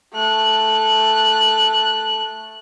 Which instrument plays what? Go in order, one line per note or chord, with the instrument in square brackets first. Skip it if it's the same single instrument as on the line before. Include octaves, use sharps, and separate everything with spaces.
[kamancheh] A3 F#6